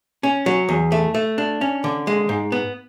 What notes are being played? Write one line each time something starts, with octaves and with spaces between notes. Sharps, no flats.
C#4
F#3
E2
A3
A3
D4
C#4
D3
G#3
G#2
B3